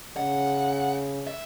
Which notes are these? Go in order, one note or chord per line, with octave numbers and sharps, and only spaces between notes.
C#3 F#5
E5